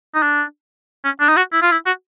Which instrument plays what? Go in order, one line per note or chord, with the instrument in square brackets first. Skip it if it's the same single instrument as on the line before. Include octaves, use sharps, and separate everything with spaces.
[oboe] D#4
D4
C#4
D4
D#4
F#4
E4
F4
E4
F#4